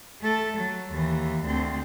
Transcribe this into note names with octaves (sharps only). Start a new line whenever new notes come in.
A3 A4
F#3
D#2 E3
D2 C4